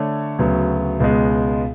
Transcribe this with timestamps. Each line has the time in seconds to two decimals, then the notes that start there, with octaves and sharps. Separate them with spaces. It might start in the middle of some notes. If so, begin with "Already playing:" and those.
Already playing: D3 A3 D4 A4 C#5
0.39 D2 C#3 F#3 B3
1.00 C#2 B2 G#3